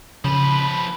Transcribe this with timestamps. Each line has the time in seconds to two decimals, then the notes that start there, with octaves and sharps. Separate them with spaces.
0.25 C#3 F3 B4 B5